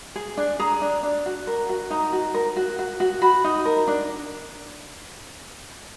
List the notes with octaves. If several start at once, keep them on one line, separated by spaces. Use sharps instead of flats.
G#4
D4
G#4 A#5
D4
D4
F#4
A#4
F#4
D#4 A#5
F#4
A#4
F#4
F#4
F#4
F#4 B5
D#4
A#4
D4